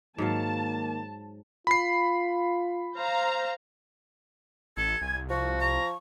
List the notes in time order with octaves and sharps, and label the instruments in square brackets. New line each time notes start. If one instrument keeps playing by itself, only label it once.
[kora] G#2 F#3 F5 [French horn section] D#3 A#3 [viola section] A5
[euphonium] F4 [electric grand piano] B5 C7
[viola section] C5 F5 A#5
[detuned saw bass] A1 [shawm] A4 [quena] G#6
[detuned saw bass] C2 [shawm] G#5
[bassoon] F3 [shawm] F#4 [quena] C#6
[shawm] A#5 [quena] C#6